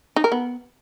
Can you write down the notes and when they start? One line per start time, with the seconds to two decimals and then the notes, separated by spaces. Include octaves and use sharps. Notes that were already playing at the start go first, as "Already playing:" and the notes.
0.16 D#4
0.24 A#4
0.32 B3